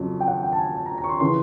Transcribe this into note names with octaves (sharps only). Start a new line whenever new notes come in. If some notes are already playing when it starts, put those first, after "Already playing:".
Already playing: F2 C#3 F#3
G5
F#5
G5
A5
G#5
A5
A#5
A#5
C#6
C6
C#3 E3 C6